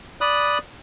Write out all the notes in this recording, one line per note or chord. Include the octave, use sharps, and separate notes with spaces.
D5 B5 D#6 F#6